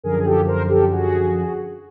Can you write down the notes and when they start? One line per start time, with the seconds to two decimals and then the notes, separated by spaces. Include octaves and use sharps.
0.03 F#2 D3 F3 G#4 A#4
0.19 G#4
0.25 G4 A4
0.47 A#4 C5
0.69 G4 A4
0.91 F#4 G#4